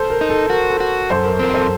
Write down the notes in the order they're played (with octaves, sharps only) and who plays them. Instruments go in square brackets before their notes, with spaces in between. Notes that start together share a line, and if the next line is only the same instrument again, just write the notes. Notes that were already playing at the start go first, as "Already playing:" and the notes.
Already playing: [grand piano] A4 C5
A#4
[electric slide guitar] D#4
[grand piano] A4
[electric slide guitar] F#4 [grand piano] A#4
[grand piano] A4
[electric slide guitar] F#4
[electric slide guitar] F#2 [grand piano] A4 C5
[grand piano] A#4
[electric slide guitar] C4 [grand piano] A#4
[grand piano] A4 C5